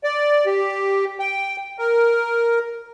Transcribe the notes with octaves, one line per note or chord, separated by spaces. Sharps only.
D5
G4
G5
A#4